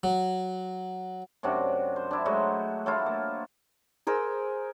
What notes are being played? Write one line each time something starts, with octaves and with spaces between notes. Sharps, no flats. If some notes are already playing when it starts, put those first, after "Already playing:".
F#3
F#2 C3 D4 F#4
C5
D4 E4
F#3 G#3 A3 F#4
F#3 A3 E4 F4
A#3
G#4 A#4 C5 E6